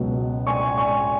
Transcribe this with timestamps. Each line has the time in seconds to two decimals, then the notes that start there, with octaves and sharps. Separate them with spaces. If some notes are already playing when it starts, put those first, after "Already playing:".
Already playing: C#2 B2 F#3 B3
0.47 G#5 C#6
0.78 G#5 C#6